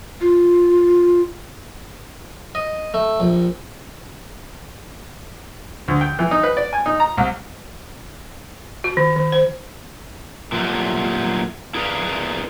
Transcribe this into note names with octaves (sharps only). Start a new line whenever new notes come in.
F4
D#5
A3
A#1
D2
G5
E3
D#4
B4
D5
G#5
D#4
A#5
C2
F#4
D#3
D#3
C5
A#2 E3 F#3 G3 A3
E4 G#4 A#4 B4 D5 F5